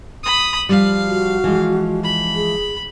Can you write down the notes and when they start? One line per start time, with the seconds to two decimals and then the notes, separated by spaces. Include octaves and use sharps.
0.24 B5 D#6
0.69 F3 G3 F5
1.08 F#4
1.44 E3 F3 G#3
2.04 B5
2.36 G#4